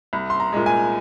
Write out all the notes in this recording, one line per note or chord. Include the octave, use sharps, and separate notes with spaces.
C2
C6
A#5
A#2 G#3
G#5